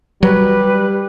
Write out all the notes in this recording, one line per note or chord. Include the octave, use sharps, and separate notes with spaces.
F#3 G3 B4